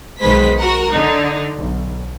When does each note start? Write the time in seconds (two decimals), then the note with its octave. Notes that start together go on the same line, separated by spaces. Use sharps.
0.20 B1 D#3 G#3 B4 C5 B6
0.59 F#4 A#4 F#5
0.92 D3 D#4
1.56 B1